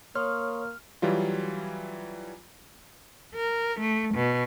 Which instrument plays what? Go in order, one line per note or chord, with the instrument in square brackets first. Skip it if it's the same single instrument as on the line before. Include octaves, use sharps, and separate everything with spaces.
[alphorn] A#3 [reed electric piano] C#5 [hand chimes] C6 C#6 D#6 [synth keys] F6
[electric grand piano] E3 F#3 G3 F4
[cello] A#4
A3
B2